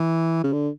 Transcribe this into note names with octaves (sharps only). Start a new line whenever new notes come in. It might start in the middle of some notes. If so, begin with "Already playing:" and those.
Already playing: E3
C#3
D3